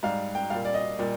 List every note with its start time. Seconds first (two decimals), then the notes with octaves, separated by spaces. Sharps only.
0.03 G#2 G3 F5
0.35 G5
0.50 A#2 G3 F5
0.65 D5
0.74 D#5
0.99 A#2 G3